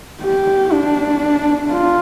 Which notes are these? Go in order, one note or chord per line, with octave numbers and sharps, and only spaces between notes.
G4
D4
F4